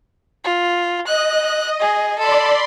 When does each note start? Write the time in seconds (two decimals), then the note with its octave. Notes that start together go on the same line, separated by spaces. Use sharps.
0.44 F4
1.07 D#5 F#6
1.80 G#4
2.18 A4 D5 B5 C6